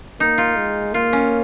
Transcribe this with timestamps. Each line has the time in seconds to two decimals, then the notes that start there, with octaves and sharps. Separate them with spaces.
0.20 A#3 D#4
0.38 F4
0.56 G#3
0.94 A#3 F4
1.13 C#4